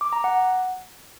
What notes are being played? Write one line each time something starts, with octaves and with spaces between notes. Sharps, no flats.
D6
A#5
F#5